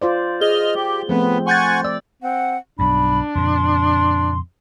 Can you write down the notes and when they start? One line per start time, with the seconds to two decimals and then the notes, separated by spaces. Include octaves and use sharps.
0.02 F4 C5 D5
0.41 G#4 D#5 F6 G7
0.75 G4
1.09 F3 A3 B3 C4
1.47 F#5 G#5 C6 C#6 G6 A6
1.84 D5 E6
2.22 C4 F#5
2.79 B1 G2 D4 B5
3.35 F2 A#2 C#3 C6